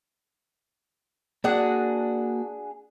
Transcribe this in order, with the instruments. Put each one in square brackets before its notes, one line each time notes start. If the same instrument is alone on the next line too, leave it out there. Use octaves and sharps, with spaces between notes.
[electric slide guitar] A#3 F#4 [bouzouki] D4 G#4 F#5